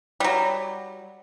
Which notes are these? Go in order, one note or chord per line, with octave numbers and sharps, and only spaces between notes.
F#3 G3